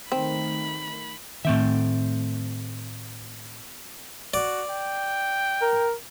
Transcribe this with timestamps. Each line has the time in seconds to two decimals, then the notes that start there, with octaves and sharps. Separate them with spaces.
0.12 D#3 A3 C4 B5
1.45 A2 D#3 A3 C4 E5
4.34 F#4 D5
4.70 G5
5.61 A#4